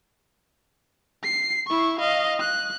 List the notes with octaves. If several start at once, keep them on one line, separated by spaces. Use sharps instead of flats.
C7
E4 C#6
D#5 F5
F#6